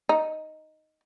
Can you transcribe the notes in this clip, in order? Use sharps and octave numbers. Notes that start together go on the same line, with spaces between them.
D#4